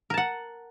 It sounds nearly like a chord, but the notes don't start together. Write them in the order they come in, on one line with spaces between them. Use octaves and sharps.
A#4 A5 F#5